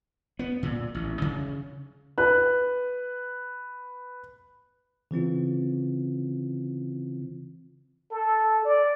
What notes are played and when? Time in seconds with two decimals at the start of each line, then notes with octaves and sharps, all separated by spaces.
0.39 B3
0.63 A#2
0.95 A1
1.22 C#3
2.18 B4 F#6
5.11 C#3 E3 C4 F4
8.12 A4
8.65 D5